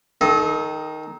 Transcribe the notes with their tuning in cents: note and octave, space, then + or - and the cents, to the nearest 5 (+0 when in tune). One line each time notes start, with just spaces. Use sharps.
D#3 +0 A4 -35 D#5 +0